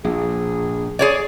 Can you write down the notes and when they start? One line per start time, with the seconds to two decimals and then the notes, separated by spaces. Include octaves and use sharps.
0.05 A#1 G#4
0.99 G#4 C#5 D5